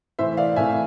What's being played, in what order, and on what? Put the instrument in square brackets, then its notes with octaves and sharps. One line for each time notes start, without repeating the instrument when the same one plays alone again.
[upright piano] A2 E3 C5 E5
D5 F5
A2 E3 E5 G#5